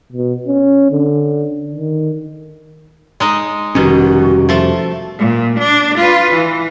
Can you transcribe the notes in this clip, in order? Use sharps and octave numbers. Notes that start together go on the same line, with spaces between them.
B2
C#4
D3
D#3
G#3 D#4 D#5
F1 B2 D#3 G3 C#4 F#4
F3 A3
A#2
D4
F4 B4
E3